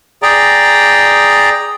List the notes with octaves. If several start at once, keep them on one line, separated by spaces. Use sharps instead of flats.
G#4 D5 G5 A#5